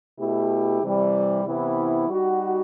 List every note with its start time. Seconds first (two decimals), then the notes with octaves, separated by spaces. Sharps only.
0.18 B2 A3 E4 G4
0.82 C3 E3 G3
1.45 C3 E3 B3 E4
2.08 G3 D#4 F#4